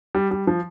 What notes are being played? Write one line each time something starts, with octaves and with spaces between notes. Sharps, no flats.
G3
G3
F3